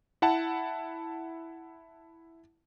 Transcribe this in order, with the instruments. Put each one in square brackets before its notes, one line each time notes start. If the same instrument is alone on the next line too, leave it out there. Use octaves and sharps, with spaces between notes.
[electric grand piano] E4 F#5 A5